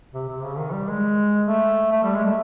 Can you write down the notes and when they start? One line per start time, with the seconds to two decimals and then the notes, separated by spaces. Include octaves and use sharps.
0.14 C3
0.29 C3
0.44 C#3
0.58 D#3
0.73 G3
0.88 G#3
1.47 A3
1.92 A3
2.03 G3
2.15 G#3
2.25 A3